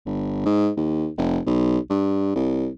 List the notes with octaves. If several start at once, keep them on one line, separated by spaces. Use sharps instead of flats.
G1
G#2
D#2
F1
B1
G2
C2